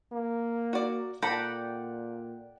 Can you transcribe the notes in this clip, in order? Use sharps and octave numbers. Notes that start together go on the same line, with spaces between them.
A#3
F#4 D5
A#2 A4 D5 F#5 G5 A#5 B5